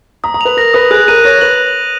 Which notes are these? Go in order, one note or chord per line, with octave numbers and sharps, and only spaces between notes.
A#5 D#6
A#5
B4 F7
A#4 A#6
B4 D#6
G#4 F#6
A#4 D#7
C#5 A#6
B4 F#7